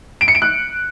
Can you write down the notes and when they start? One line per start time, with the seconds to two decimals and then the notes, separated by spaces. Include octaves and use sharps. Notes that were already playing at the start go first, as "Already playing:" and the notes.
0.21 D7
0.28 C#7
0.35 D7
0.42 F#6